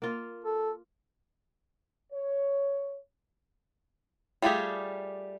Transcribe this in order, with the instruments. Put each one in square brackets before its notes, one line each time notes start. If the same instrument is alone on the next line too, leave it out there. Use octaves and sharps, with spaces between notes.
[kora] A#3 F4
[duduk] A4
[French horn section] C#5
[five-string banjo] G3 A3 F4 G4 G#4